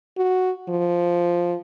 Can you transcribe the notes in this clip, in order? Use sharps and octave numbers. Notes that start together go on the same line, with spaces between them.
F#4
F3